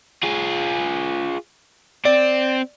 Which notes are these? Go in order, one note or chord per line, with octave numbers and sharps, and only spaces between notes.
F4 G#4
C4 D5